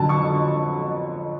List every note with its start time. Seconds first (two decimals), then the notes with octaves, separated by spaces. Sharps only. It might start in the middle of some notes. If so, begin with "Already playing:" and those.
Already playing: F2 D3 F#3 A5
0.09 C#6